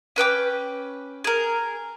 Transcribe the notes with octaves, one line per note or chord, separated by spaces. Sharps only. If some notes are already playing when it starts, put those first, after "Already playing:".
C#4 B4 G5 D6
G#4 A#4